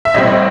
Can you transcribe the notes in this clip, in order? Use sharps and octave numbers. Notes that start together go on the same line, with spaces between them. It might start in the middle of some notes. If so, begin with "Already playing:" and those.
E5
A1 A2 G3 C4 D#5